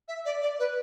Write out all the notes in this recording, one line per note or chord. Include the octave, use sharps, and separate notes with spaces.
E5
D5
D5
B4